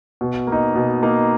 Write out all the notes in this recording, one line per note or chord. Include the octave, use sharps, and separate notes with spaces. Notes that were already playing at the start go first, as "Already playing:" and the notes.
B2
A#3
D#4
B2
A#3 D#4